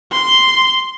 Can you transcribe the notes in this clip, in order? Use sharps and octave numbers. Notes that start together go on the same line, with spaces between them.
C6